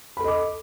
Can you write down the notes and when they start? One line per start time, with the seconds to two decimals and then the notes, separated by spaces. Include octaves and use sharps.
0.17 B5
0.21 A4
0.24 D#5
0.28 D6